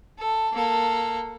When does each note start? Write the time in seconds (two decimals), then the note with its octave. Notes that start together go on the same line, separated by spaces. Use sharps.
0.18 A4
0.53 A#3 A4